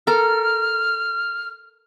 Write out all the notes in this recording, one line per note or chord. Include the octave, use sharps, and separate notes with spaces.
A4 A#4 F6